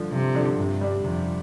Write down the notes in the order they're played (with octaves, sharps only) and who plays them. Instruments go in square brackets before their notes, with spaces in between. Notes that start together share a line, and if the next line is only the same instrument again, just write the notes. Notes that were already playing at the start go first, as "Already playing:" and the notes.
Already playing: [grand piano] G2 D3 F3 D4
[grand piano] G2 [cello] C3
[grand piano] D3 F3 D4
[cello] G2 [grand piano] C3
[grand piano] G3 D4
[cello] F2 [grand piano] C3